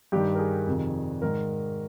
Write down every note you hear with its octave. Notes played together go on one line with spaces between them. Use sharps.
G2 D#3 G4
A#4
G#4
F2 C3 D#3
G#2 D#3 A#4